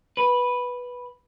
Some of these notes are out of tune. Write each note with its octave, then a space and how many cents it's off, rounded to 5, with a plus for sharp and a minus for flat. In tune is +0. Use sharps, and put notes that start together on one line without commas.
B4 -5